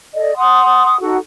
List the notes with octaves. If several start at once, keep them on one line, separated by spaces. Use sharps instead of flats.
A4 D5 D#5
F#5 C6 D#6
D#4 F#4 A4 F#5